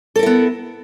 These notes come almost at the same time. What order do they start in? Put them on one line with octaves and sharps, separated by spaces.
A4 A#4 E4 B3